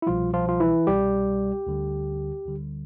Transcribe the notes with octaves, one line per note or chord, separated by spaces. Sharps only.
E4
C2 B2 F3 G3 F4
F3 F4
F4
E3 E4
C2 B2 G3 G4
D2 D3 G3
D2 D3 G3